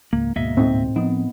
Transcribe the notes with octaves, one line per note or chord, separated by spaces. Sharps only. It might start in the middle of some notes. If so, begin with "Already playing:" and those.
C#2 G#2 A#3
D2 G#2 B2 A#3 D#5 E5
A2 C4 D#4
F3 B3 C4 D#4